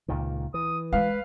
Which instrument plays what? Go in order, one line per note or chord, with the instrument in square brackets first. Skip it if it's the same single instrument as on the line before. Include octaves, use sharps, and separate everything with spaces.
[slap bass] C#2 A#2 D#3
[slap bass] E3 [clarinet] D#6
[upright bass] G#3 [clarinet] B4 [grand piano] F5